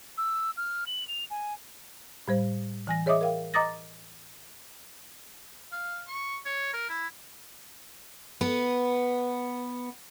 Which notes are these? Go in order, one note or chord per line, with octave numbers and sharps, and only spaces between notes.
E6
F6
F#7
F7
G#5
A2 G3 C5
E3 G#5 A#6
G#4 C#5 D#5 E5 D6 D#6
A#4 F5 G5
D#5 A#5 D6 D#6 A6 A#6
F5
C#6
C#5
A#4
E4
B3 B4